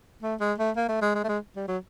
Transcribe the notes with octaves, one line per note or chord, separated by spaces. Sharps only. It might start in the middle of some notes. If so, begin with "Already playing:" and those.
A3
G#3
A3
A#3
A3
G#3
G#3
A3
G#3
G3
F#3